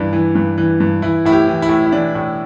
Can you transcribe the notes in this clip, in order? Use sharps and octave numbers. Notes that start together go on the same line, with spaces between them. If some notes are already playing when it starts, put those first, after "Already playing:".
Already playing: G2 E3 D4
E3
G2
E3
G2
E3 E4
A2 E4
G4
E3
E4
A2
E4
E3 D4
A2